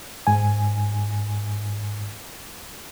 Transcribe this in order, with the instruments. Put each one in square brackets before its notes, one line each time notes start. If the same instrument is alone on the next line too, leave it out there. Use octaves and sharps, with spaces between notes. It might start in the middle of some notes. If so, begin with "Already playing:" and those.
[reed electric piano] G#2 G#5